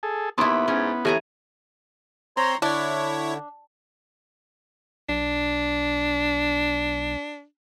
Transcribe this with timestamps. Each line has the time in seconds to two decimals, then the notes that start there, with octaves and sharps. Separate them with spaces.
0.03 G#4 A4
0.38 D#2 B3 E4 A5 C6
0.68 G#2 C#4
1.05 A2 E3 G4 G#5 A#5
2.37 C4 C#5 A#5 C6
2.62 D3 D4 E4 C#5
5.09 B1 D4